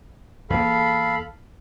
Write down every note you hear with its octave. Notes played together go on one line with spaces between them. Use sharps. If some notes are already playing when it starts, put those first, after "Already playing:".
E2 A#3 A4 F5 B5